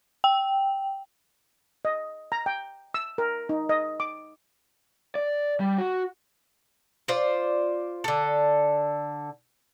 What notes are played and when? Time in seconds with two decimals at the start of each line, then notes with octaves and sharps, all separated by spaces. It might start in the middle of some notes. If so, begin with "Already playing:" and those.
0.24 G5
1.85 D#5
2.32 A#5
2.46 G5
2.94 E6
3.18 A#4
3.49 D#4
3.69 D#5
4.00 D6
5.15 D5
5.60 G3
5.78 F#4
7.08 F4 C5 D5
8.04 D3 A4